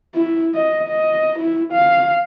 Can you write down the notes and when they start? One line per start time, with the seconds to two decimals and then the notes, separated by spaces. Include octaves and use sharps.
0.15 E4
0.54 D#5
0.88 D#5
1.39 E4
1.73 F5